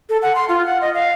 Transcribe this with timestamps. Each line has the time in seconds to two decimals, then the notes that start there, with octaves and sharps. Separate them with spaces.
0.09 A4
0.22 F#5
0.35 C6
0.49 F4
0.66 F#5
0.81 D#5
0.94 F5